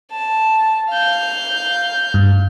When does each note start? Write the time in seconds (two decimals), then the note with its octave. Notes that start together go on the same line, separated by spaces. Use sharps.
0.11 A5
0.90 F5 G6
2.14 G2